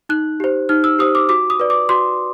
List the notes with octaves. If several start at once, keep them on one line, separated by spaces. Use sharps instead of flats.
D#4 F#6
G4 C5
D#4 F6
E6
G4 C5 D#6
D6
F#4 D6
D#6
B4 D5
D6
F#4 C6